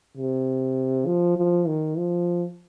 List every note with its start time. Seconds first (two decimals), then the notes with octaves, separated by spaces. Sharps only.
0.17 C3
1.06 F3
1.37 F3
1.67 D#3
1.98 F3